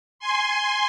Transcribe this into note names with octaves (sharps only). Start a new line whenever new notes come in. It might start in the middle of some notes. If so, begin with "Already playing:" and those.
G#5 C6